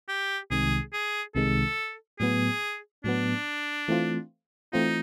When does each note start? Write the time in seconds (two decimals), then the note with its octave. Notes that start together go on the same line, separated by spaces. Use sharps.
0.09 G4
0.51 C2 C3 D#3 G#3 G#4
0.93 G#4
1.35 C2 C3 D#3 G#3 A4
2.19 A2 F#3 B3 G#4
3.04 A2 F#3 B3 D4
3.88 E3 A3 C4 F4
4.73 E3 A3 C4 D#4 F4